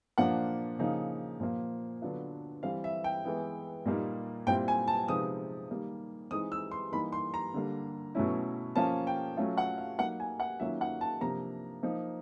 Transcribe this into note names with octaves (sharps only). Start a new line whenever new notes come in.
A#2 F3 A#3 D4 F4 F#5
C#3 F3 A#3 D#4
A#2 F3 A#3
D3 F#3 B3 D4 F4
E3 G3 C4 F5
E5
G5
E3 G#3 B3 E4
A#2 G3 A#3 D#4
A#2 G3 C4 E4 G5
G#5
A5
C3 F3 G#3 B3 D#4 D#6
D#3 G3 A#3
E3 G#3 C4 D#4 D#6
E6
C6
E3 G3 A#3 D#4 B5
C6
A#5
D3 G3 A#3
B2 F#3 A3 C#4 E4
F3 A#3 C#4 F4 A5
G5
F#3 A3 C#4 F4
F#5
F5
F#3 A#3 D#4 F#5
G#5
F#5
D#3 F#3 A#3 C#4 F4 E5
F#5
A5
C3 F3 A#3 D4 A#5
F3 A#3 D#4